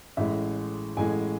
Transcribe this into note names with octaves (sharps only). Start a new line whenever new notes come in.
A1 A2 G#3 E5
A1 A2 G#3 G#5